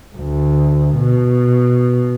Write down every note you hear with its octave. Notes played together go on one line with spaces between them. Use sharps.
D2
B2